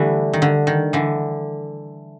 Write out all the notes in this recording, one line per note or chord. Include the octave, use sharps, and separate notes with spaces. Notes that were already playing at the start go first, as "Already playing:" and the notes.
Already playing: D3 E3 G3 A3
D#3
D3
D#3
D3 E3